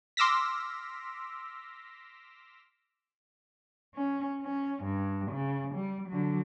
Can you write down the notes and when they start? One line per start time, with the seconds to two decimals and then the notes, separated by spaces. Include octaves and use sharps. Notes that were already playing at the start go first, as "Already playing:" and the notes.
0.17 C6 D6 E6 F6 A#6 B6
3.95 C#4
4.42 C#4
4.84 G2
5.32 C#3
5.75 G3
6.09 D3 F#3